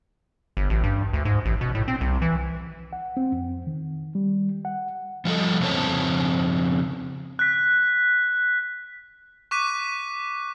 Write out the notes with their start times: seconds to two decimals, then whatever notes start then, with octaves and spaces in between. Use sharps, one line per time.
0.57 G1
0.70 A1
0.84 G2
1.13 D2
1.25 G#2
1.45 A1
1.61 B2
1.75 A2
1.88 C4
2.01 C2
2.22 E3
2.93 F#5
3.17 C4
3.32 F2
3.67 D#3
4.15 G3
4.65 F#5
5.25 F3 G3 A4 D#5
5.61 F2 C#3 C4 C5 C#5 A5
7.39 F#6 B6
9.51 C#6 D6 F#6 B6 D#7